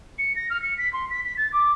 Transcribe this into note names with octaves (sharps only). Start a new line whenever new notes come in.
C#7
A#6
F6
C#7
B6
C6
B6
B6
A6
D6